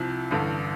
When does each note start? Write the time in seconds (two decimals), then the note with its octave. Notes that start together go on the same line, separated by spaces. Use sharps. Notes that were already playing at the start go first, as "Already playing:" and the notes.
Already playing: C2 C3 F3
0.31 A1 G2 D3